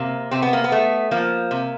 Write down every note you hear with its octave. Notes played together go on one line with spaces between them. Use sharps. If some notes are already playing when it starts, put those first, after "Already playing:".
Already playing: C3 A#3
C3 C4
B3
A#3
B3
A3
F3 A#3
C3